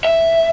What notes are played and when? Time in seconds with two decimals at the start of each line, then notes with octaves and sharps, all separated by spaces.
0.05 E5